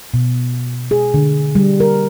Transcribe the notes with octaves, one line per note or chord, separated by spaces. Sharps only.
B2
G#4
D3
G3
A#4